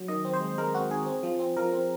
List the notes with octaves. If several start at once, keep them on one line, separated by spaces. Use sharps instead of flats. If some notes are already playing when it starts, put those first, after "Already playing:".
Already playing: F#3
D#3 D#5
C4
C5
G#3
G#3 A#4
C4 F#4
D#3 G#4
C4
F3
C4
F3 A#4
C4